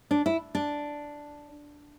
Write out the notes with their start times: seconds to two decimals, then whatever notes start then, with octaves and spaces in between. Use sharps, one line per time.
0.11 D4
0.26 E4
0.55 D4